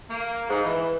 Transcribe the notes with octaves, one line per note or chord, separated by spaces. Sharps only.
A#3
G#2
E3